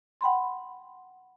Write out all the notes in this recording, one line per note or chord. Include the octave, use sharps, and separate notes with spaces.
F#5 G5 B5 C6